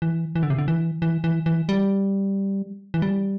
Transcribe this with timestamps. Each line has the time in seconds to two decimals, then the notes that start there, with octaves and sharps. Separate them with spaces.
0.02 E3
0.36 E3
0.43 D3
0.50 C3
0.58 D3
0.68 E3
1.02 E3
1.24 E3
1.46 E3
1.69 G3
2.94 E3
3.02 G3